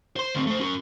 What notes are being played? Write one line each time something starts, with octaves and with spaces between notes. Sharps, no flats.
C5 C6
D2 C4
A3 C5
C#4 F#4